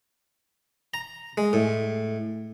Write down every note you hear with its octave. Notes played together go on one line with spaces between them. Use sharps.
A#5
G#3
A2